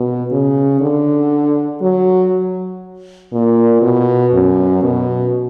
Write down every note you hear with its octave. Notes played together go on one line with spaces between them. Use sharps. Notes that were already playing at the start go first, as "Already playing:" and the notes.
Already playing: B2
C#3
D3
F#3
A#2
B2
F#2
B2